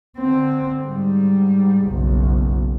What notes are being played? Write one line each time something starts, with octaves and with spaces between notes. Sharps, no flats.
D3 C4
G#2 G3
F#1 B1